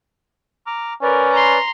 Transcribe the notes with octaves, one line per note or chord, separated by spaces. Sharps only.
A#5 D6 F6
C#4 A#4 B4 D5
A#5 C6